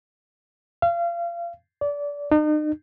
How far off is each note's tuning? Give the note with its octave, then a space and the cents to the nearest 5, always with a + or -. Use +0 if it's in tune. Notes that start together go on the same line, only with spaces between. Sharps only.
F5 -30
D5 -25
D#4 -40